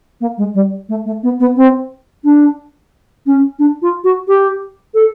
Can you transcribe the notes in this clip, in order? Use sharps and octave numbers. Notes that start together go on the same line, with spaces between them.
A#3
G#3
G3
A3
A3
B3
B3
C4
D4
C#4
D4
F4
F#4
G4
A4